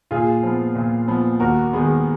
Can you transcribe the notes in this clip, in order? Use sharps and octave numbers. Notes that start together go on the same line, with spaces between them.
A#2 F4 G#4
F3 B3
A#2
F3 B3
D#2 F#4 A#4
D#3 G#3 B3